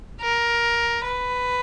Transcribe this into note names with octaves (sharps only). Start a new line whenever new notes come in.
A#4
B4